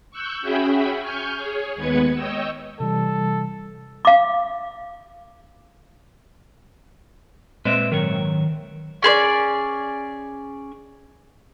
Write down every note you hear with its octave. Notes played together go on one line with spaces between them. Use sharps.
C#6 E6 F#6 G6
C#4 F#4 G#4 E5 G5 B5
G#5 C#6 F6 G6
G#4 C#5
D#2 G#3 B3 B4 G#6 C#7
C#5 D#5 G5 E6
C3 E3 G3 A4
F5 D6
A#2 G#3 C4 B4 D5 E5
G#2 D#3 F#3 C#5
C#4 G#4 C5 D5